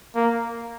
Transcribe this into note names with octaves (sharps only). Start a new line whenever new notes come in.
A#3